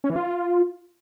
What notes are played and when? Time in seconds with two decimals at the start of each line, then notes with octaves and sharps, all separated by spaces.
0.04 C#4
0.10 E3
0.16 F4